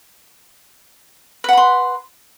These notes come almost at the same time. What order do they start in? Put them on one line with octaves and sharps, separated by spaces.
B4 F#5 B5 C6